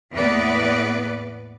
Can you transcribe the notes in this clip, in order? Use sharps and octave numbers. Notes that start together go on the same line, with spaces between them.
E2 A2 A#3 B3 B4 D5